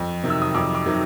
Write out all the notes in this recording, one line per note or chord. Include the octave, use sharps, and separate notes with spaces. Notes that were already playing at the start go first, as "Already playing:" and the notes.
Already playing: F2
C3 D#3 F#3
E6
D#6
F2 D6
D6
C3 D#3 F#3